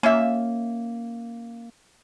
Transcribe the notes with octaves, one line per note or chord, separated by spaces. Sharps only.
A#3 C#4 F4 E5